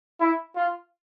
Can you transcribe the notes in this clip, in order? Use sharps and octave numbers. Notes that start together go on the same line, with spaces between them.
E4
F4